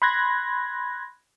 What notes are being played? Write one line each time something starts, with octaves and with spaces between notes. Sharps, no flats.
B5 C6 F#6 G#6 A#6